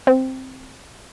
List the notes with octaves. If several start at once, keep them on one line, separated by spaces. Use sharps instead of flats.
C4